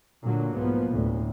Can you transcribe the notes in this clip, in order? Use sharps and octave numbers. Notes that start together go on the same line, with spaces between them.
A#2 D3 F#3 A#3
B1 G#2 F3 A#3 B3
D2 A2